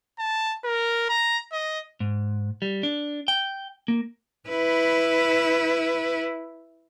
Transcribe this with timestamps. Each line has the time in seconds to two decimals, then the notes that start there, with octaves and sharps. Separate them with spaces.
0.19 A5
0.64 A#4
1.09 A#5
1.52 D#5
2.00 G#2
2.62 G3
2.83 D4
3.28 G5
3.88 A#3
4.49 E4 B4